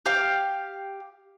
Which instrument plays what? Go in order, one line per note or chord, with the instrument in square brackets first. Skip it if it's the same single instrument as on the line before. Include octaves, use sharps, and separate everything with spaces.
[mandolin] G4 F5